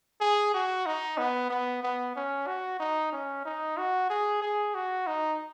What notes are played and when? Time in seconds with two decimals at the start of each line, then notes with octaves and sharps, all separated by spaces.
0.21 G#4
0.54 F#4
0.86 D#4
1.18 B3
1.50 B3
1.83 B3
2.16 C#4
2.47 F#4
2.80 D#4
3.13 C#4
3.45 D#4
3.78 F#4
4.10 G#4
4.42 G#4
4.74 F#4
5.07 D#4